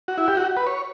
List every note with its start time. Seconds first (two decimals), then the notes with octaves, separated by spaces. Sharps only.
0.08 F#4
0.18 E4
0.28 G4
0.37 F#4
0.57 B4
0.67 C#5